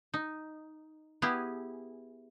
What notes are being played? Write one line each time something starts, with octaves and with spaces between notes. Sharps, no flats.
D#4
B3 E4 G4 G#4